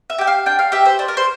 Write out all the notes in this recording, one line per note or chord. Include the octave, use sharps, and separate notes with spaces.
E5
G4 G5
F5
D4 G5
F5
G4 E5
C5
D4 C5
A#4
C5